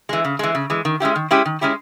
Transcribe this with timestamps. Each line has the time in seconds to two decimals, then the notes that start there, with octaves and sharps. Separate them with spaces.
0.09 E3 G#3
0.25 C#3
0.39 E3 G#3
0.55 C#3
0.70 E3 G#3
0.85 D#3
1.00 G#3 C#4 E4 G4
1.16 D#3
1.31 G#3 C#4 E4 G4
1.46 D#3
1.61 G#3 C#4 E4 G4